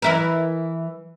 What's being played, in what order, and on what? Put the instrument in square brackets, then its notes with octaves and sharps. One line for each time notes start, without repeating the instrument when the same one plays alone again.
[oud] E3 E4 A#4